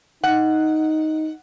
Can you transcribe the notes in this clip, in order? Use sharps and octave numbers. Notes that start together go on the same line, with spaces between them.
D#4 F#5